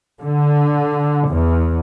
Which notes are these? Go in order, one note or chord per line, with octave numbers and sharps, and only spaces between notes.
D3
E2